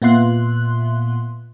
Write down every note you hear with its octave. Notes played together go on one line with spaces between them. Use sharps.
A#2 B3 F4 E5 C6 F#6